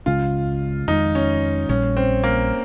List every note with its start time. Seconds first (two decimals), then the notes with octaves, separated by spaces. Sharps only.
0.06 C#2 C#3 G#3 C#4 F4
0.88 F2 D#3 G#3 D#4
1.15 C#4
1.69 A#1 A#2 G3 C#4
1.97 C4
2.24 A#3